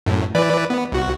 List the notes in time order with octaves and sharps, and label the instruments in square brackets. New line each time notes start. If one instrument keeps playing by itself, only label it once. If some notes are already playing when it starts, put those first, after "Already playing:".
[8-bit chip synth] F#2 A2
E3 B4 D5
B3
C2 F#4